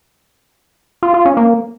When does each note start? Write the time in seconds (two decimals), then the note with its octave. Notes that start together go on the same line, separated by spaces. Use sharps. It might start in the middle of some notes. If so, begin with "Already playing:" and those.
1.03 F4
1.14 F4
1.25 C#4
1.37 A#3